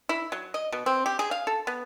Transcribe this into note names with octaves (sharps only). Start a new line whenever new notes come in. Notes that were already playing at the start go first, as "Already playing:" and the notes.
E4
F#3
D#5
B2
C4
G4
G#4
F5
A4
B3